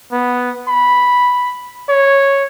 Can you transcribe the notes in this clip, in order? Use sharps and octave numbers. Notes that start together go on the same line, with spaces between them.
B3
B5
C#5